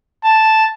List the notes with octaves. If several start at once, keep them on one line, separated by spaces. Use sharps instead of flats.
A5